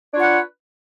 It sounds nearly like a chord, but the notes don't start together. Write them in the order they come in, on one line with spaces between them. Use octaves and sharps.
D4 C#5 F4 F#5 B4